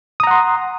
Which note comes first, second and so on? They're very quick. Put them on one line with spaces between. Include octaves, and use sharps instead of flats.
D#6 A#5 F#5 C6